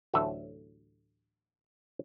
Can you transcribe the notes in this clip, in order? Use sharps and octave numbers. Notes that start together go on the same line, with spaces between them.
A1 D2 A2 F#3 A4 E5